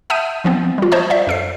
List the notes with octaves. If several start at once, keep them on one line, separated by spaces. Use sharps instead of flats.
E5 F#5 A5 D#6 G6 D#7
E3 F3 B3 C4
G3 F4
C5 C#5 D#5 A5 C#6 D#6
D5 E5
F#2 A4 C7